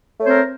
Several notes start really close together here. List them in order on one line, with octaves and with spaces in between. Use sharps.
A3 C#5 C5 C4 A#4